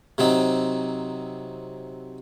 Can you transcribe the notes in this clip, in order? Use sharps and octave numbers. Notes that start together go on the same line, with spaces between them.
C3 F#3 C4 D#4